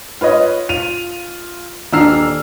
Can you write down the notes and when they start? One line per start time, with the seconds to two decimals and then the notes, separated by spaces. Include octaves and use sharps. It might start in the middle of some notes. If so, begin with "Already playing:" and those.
0.21 F4 B4 C#5 D#5
0.69 F4 D#7 F7
1.93 D#1 D4 A#5 E6 F6 C7